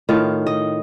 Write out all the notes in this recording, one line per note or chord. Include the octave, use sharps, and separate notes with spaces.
A2 D#3 F4
D#5